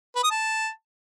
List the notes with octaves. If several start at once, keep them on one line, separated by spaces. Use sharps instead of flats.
B4
D#6
A5